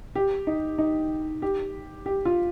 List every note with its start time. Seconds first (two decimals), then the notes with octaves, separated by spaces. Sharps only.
0.15 G4
0.47 D#4
0.78 D#4
1.42 G4
2.06 G4
2.25 F4